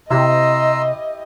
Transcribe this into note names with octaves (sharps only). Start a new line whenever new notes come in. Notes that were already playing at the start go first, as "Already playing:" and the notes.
C3 E4 G4 D#5 A#5 C6 E6